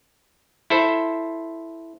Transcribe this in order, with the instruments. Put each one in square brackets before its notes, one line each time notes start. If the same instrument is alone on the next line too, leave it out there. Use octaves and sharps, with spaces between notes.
[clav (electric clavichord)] E4 A4 C5